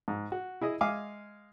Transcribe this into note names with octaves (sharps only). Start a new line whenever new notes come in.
G#2
F#4
E4 G#4 D#5
G#3 E5 F5 G#5 D6